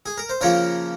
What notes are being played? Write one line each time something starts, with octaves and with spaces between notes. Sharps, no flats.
G#4
A#4
C5
C#3 F3 A#3 A#4 C#5